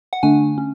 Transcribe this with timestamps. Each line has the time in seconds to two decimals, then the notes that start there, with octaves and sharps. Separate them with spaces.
0.13 F#5
0.23 D3 A3 D4 G#5
0.58 C#4